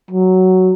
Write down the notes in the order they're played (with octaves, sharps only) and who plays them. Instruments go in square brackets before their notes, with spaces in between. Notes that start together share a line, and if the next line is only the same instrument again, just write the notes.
[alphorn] F#3